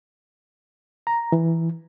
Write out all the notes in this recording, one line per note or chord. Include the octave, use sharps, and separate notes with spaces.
A#5
E3